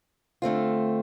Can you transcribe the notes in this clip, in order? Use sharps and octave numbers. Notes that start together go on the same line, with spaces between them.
D3 A3 C4 F4